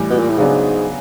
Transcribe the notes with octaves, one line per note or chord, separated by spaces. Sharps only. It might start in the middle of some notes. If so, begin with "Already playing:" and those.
Already playing: A2 E3 G3
B2
A#2
A2
G#2 C#3 F#3 B3 D4